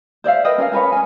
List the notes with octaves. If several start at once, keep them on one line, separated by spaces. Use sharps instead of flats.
C5 D5 E5 F5
A#4 B4 D#5 G5
C#4 A#4 D5 F5
C#4 A#4 B4 C#5
C#4 G#5